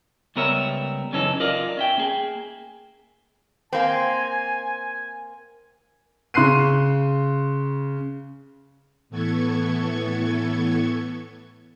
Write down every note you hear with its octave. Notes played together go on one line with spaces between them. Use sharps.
C#2 G3 B3 A#4 C#5 E5
F#2 C#3 E3 C#4 D#4 A4
F4 A#4 D5 D#5 F5
C#4 E5 G5
A#3 G#4
A#3 C4 G#5
C#3 C6 F#6 C7 D#7
A2 E3 B3 A4 C#6 G#6